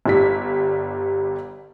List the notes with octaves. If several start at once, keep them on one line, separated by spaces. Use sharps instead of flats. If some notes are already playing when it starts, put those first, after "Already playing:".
G1 G3 B6